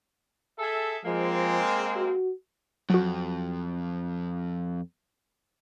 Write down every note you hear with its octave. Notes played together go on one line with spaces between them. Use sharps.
G#4 A4 E5
F3 G#3 A#3 C4
F#4
F2 F#3 F#4